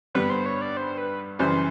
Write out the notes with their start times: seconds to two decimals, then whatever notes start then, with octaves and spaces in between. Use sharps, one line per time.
0.15 G2 D3 G3 B3 B4
0.30 C5
0.46 C#5
0.62 D5
0.77 C5
0.98 B4
1.39 F#2 C#3 E3 G3 C5